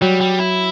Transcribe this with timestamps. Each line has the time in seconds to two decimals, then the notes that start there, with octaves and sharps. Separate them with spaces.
0.02 F#3 G3
0.21 G3
0.39 E4